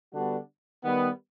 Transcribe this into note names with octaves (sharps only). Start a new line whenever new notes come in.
D3 G3 B3 D4 F#4
D#3 G3 B3